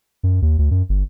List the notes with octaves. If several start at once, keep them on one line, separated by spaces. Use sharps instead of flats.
F#2
D#2
D2
F#2
G1